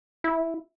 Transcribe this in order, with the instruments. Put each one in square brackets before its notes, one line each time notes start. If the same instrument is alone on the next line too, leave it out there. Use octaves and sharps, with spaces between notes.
[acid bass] E4